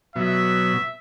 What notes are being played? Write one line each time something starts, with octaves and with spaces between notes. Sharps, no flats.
B2 F#3 E5